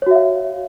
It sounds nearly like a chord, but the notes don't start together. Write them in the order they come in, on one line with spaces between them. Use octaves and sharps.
C#5 F#4 E5 F5